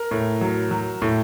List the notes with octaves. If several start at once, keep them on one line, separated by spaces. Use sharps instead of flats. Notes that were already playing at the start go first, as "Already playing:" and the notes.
Already playing: A#4
A2
F#3
F#3
A2